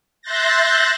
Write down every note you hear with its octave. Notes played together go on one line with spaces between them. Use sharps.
E5 C6 F#6 G6 A6 A#6